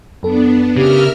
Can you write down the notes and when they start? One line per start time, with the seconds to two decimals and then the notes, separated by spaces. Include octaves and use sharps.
0.23 F#2 B3 D4 A4
0.76 C#3 G4 A#4 E5 F6